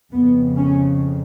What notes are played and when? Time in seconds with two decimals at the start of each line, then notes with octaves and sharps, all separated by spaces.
0.12 F2 C#3 B3
0.56 C#4